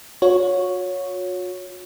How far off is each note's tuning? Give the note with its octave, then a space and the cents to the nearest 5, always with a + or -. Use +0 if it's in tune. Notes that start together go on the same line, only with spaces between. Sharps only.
F#4 -45 C#5 +0